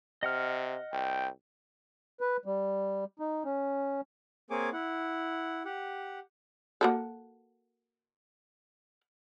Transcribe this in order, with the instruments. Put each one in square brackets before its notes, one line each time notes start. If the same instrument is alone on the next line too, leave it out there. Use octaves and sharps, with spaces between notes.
[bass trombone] C3 [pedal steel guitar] D#5 F#5 F6
[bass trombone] C2 [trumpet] G5
[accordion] B4
G3
D#4
C#4
[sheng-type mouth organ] A#3 C4 G#4 C#5 G#5 D6
E4 F#5
G4 F#5
[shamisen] A#3 F#4 A4